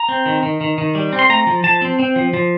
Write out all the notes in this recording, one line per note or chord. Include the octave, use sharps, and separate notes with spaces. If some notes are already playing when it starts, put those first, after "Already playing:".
Already playing: A#5
C4
D#3
D#3
D#3
D#3
G3
C4
C6
A3 A#5
F3
F3 A5
C4
C4
F3
F3